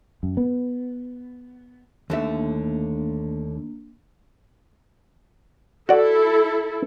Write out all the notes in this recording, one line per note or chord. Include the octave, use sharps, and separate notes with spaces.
F#2
B3
D#2 D3 A3 A#3 D4 E5
E4 F#4 A4 D5